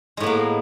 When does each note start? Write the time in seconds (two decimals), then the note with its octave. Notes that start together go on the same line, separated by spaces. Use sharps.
0.17 G#3
0.20 A2
0.23 B3
0.26 A#3